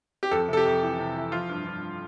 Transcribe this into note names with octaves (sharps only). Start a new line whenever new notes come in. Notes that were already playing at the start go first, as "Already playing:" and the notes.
G4
F2 A4
C3 A4
G4
F2
E3
C3
E3
F3 F4
G2
G2